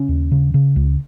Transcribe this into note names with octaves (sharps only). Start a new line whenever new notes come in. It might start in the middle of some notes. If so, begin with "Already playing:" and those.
Already playing: C#3 C#4
D#2
C#3
C#3
C#2